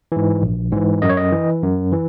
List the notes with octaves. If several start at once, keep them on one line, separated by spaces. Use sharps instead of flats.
G#2 E3
A#1
G#2 E3
F#2 D#5
C#5
D#5
E3
F#2
E3